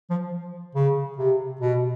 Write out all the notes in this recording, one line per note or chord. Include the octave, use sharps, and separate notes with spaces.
F3
C#3
C3
B2